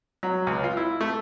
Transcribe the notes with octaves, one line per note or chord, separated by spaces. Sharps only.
F#3
C#2
F4
E4
A3